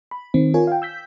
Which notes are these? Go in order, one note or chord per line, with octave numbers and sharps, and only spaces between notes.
B5
D#3 C4
F4 A#4 C#5 G#5
F5 G5
E6 G6 B6